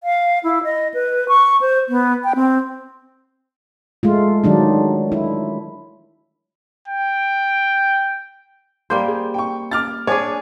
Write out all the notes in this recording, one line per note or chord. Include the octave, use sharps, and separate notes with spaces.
F5
E4
D#5
B4
C#6
C5
B3
G5
C4
G#3 A3 F4
D#3 F#3 D4 D#4
E4
G5
G3 A#3 C5 G6
G#4
G5 C#6
D6 F6 A6
D4 G#4 C#5 G#5 D6